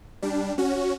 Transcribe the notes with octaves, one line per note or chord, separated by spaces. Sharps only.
G3 D4
C#4 F#4